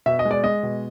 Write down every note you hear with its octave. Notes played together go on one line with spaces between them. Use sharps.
B2 E5
D#5
G#3
D5
G#3 D#5
B2